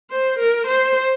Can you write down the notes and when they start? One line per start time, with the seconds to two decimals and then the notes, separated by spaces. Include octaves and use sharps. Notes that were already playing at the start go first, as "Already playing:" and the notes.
0.11 C5
0.39 A#4
0.67 C5